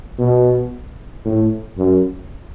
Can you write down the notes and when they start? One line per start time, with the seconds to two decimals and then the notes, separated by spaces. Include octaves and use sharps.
0.19 B2
1.25 A2
1.78 F#2